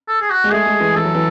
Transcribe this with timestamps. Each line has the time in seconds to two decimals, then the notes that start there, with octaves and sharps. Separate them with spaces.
0.08 A4
0.21 G#4
0.30 F#4
0.44 G#3
0.51 A3 G#4
0.66 G#3
0.80 E3
0.95 E3 A4
1.04 F#3
1.15 E3